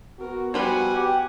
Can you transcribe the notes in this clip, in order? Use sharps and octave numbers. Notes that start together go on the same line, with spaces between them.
B3 F#4 A#4
F3 G3 B4 F#5 G#5
G4